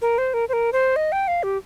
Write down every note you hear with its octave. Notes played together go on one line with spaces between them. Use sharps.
A#4
C5
A#4
C5
A#4
C5
D#5
G5
F5
G4